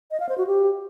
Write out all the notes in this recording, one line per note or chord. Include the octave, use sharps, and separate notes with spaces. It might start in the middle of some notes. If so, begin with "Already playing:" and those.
D#5
F5
C5
F#4
G4